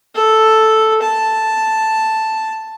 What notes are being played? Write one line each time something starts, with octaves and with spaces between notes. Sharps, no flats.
A4
A5